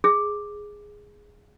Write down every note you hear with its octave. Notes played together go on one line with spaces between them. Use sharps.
G#4